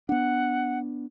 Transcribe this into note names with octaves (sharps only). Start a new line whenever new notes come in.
B3 D4 F#5